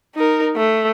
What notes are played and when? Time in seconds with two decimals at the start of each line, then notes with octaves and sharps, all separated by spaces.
0.15 D#4 A#4
0.56 A3